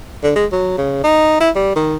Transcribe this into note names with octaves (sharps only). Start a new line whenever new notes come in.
D3
G#3
F#3
C#3
D#4
E4
G3
D#3